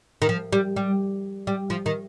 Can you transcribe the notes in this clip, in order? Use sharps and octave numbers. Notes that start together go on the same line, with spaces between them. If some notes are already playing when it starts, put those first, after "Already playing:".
D#3
F3
G3
G3
G3
F3
D#3